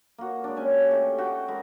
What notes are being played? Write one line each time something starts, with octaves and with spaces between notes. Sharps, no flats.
A#3 F#4
G#3 D4
C#4 G4 G#5
A3 G4
F#4 G5 A5
G#3 F#4 A#4 B4